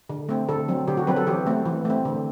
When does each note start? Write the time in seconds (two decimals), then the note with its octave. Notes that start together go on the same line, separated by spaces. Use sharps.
0.09 D3
0.29 A3 C4
0.49 D3 A4
0.68 F#3 C4
0.88 D3 G4
0.97 F#4
1.07 F#3 C4 B4
1.16 A4
1.27 E3 G4
1.46 A3 C4
1.65 E3
1.85 A3 C4
2.05 D3